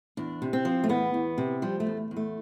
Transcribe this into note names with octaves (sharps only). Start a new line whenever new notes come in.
E2 D4
C3
C4
F3
A3
E2 B3
E2
C3
F3 G3
A3
E2
E2
A3